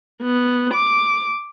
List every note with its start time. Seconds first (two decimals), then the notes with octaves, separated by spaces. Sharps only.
0.23 B3
0.74 D6